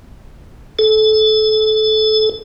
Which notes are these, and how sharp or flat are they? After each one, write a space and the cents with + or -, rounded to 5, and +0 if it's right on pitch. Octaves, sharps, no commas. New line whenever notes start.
A4 -25